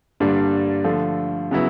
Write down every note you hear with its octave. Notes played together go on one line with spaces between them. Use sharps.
G2 D3 G3 A#3 D4
D3 F3 A3
C#3 F#3 B3 E4